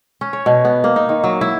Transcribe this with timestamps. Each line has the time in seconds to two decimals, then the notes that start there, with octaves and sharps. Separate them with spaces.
0.21 C#4
0.33 C#5
0.46 B2
0.65 B3
0.84 A#3
0.96 D#4
1.09 D#3
1.24 F#3
1.41 E4